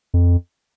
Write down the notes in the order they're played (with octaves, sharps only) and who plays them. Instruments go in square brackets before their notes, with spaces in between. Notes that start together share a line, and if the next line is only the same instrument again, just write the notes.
[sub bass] F2